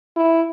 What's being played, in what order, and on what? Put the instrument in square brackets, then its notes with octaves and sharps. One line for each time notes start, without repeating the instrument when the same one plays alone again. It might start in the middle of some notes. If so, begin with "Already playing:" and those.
[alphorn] E4